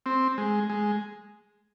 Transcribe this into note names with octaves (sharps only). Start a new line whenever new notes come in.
C4
G#3
G#3